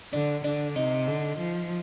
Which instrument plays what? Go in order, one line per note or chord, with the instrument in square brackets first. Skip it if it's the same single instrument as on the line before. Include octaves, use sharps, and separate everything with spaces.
[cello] D3 [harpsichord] D4
[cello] D3 [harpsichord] D4
[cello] C3 [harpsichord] D#4
[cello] D3
F3